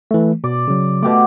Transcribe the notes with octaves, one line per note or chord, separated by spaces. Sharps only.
E3 A3
B2 D5
C#3 F#3
B2 A3 G4 D5